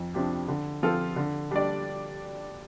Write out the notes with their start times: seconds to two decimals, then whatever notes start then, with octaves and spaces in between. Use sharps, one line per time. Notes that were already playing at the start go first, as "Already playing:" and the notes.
Already playing: F2
0.14 C3 F3 D4 G4
0.48 D3
0.83 F3 C4 F4 A4
1.16 D3
1.51 G3 D4 G4 D5